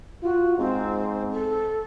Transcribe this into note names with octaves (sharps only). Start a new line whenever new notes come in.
F4 F#4
G#2 C4
A4